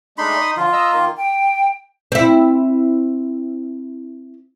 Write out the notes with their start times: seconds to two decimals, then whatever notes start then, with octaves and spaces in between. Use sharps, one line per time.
0.18 G#3 A3 D4 D#4 B5 C6
0.41 D#6
0.57 D3 F3 F4
0.73 D#5 A#5 E6
0.93 D#3 A#3
1.17 G5
2.12 C4 E4